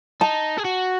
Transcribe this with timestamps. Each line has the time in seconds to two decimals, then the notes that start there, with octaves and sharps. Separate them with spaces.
0.21 D#4 A5
0.58 G#4
0.65 F#4